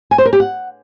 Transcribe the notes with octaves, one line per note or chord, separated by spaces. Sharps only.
G#5
C5
A#4
G4
F#5